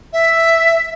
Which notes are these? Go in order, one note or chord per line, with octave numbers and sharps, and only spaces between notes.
E5